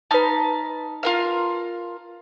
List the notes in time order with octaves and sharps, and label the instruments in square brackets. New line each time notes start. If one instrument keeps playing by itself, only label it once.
[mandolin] D#4 F6 [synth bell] B4 A5
[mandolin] F4 A#4 F5